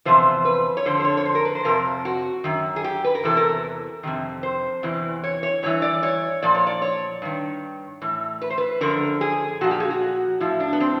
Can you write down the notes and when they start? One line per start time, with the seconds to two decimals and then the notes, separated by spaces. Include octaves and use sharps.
0.05 E2 C3 F3 C5
0.45 B4
0.77 C#5
0.86 F2 D3 F3 C5
1.00 C5
1.04 C#5
1.17 C#5
1.25 C5
1.35 A#4
1.45 B4
1.55 C5
1.65 F2 C3 F3 A#4
2.05 F#4
2.44 F#2 D#3
2.76 G#4
2.84 G4
3.04 B4
3.15 A#4
3.23 E2 C3 E3 A4
3.37 A#4
4.03 F2 C3 D#3
4.43 C5
4.83 E2 C3 E3
5.24 C#5
5.43 C#5
5.63 G2 E3 C#5
5.82 D5
6.03 C#5
6.43 A#2 F3 D5
6.55 C#5
6.67 D5
6.82 C#5
7.22 G2 D#3
8.02 A2 E3
8.42 B4
8.50 C5
8.58 B4
8.81 F#2 D3 F3 A#4
9.21 G#4
9.61 A#2 F3 F#4
9.71 G4
9.80 G#4
9.91 F#4
10.40 A2 F3 E4
10.60 D4
10.73 B3
10.80 C4